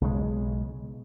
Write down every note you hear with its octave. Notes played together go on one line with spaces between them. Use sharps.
B1 C#3 G#3